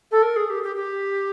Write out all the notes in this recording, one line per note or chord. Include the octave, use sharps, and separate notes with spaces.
A4
A#4
G#4
G4
G4
G4